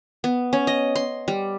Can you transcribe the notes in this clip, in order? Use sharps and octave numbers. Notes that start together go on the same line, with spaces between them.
B3
C#4
D#5
C6
G3